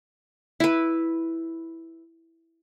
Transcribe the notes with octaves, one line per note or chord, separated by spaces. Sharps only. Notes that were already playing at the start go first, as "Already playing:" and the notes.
E4 B4